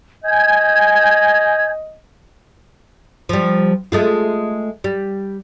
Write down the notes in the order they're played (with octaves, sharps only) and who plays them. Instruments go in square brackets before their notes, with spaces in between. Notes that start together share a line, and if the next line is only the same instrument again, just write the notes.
[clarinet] D#5 [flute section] G#5 G6 G#6
[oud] F3 G3
G#3 A3 F4
G3